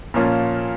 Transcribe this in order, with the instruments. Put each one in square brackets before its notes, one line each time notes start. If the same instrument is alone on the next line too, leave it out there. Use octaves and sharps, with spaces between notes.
[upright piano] A#2 F3 A#3 C#4 F4